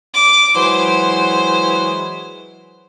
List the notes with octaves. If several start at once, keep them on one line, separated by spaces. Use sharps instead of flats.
D6
E3 F#3 G#3 C5